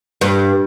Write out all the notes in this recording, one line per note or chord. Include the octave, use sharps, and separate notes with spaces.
G2